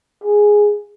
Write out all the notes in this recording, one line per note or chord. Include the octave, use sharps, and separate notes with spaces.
G#4